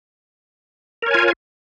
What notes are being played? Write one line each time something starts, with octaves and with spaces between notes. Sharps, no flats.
F4 A#4 C#5 G#5